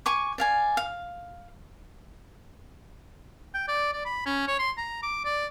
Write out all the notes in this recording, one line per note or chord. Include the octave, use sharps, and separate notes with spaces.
G#5 C#6 D6
D5 F5 G#5
F5
G5
D5
D5
B5
C#4
C#5
C6
A#5
D6
D5